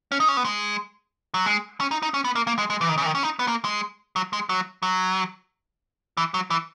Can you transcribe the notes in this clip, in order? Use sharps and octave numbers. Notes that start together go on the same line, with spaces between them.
C#4
D#4
C#4
B3
G#3
F#3
G#3
C#4
D#4
D#4
C#4
B3
A#3
A#3
G#3
G#3
E3
D#3
C#3
E3
D#3
C#4
D#4
B3
A#3
G#3
F#3
G#3
F#3
F#3
E3
F#3
E3